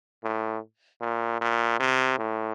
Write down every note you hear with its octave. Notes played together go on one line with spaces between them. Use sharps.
A2
A#2
A#2
C3
A2